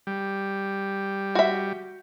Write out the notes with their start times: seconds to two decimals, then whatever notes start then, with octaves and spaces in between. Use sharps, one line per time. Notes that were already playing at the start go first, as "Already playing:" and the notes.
0.07 G3
1.35 F#4 E5